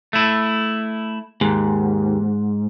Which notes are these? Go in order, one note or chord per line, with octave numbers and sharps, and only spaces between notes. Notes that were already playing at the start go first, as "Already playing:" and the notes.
A3 E4
D#2 G#2